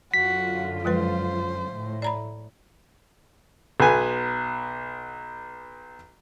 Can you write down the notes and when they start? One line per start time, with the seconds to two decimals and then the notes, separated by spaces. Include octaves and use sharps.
0.14 F#2 D3 F4 F#4 B6
0.85 F3 G#3 B4 C5
1.72 A2
2.02 D5 A#5 B5
3.80 B1 B3 G#5